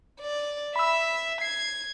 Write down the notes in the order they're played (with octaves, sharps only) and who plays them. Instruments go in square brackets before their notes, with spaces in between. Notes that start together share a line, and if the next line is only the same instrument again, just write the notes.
[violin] D5
[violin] E5 [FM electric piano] B5 E6
[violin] G#6 [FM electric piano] C7